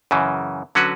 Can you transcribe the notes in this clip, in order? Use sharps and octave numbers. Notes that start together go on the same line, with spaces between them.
F#2 C#3 E3
D3 F#3 C#4 F#4 B4